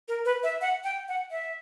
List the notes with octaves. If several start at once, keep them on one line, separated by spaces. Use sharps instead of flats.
A#4
B4
E5
F#5
G5
F#5
E5